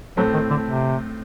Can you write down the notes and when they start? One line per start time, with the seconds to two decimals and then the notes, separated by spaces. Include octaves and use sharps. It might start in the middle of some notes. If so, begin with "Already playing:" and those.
0.17 A2 F#3 A3 C4
0.34 D#3
0.50 D3
0.66 C3